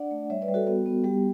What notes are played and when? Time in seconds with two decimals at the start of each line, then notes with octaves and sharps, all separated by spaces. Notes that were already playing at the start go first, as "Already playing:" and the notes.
Already playing: D4 D5 F#5
0.11 A3
0.30 G3 C#5 E5
0.42 B4 D5
0.48 G3
0.54 F#4 A4
0.67 B3 F#4
0.86 B3
1.04 G3 G4